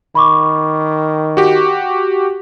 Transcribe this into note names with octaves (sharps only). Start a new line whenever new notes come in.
D#3 B5 C#6 D6
F#4 G4